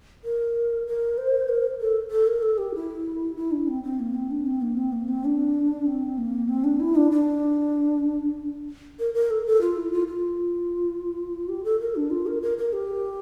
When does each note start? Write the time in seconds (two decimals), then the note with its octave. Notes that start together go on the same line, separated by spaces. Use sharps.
0.25 A#4
0.87 A#4
1.18 C5
1.49 A#4
1.81 A4
2.11 A4
2.27 A#4
2.43 A4
2.58 G4
2.75 E4
3.36 E4
3.52 D4
3.68 C4
3.84 C4
4.00 A#3
4.14 C4
4.31 D4
4.46 C4
4.62 A#3
4.77 C4
4.92 A#3
5.08 C4
5.25 D4
5.86 C4
6.18 A#3
6.48 C4
6.64 D4
6.80 E4
6.96 D4
7.12 D4
8.99 A#4
9.14 A#4
9.30 A4
9.46 A4
9.61 F4
9.77 E4
9.92 F4
10.08 F4
11.49 G4
11.64 A4
11.80 A#4
11.96 D4
12.10 F4
12.27 A#4
12.42 A#4
12.58 A#4
12.73 G4